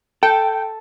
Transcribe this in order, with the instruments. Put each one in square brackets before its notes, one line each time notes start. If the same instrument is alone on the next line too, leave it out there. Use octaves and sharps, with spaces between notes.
[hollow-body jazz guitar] A4 [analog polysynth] G5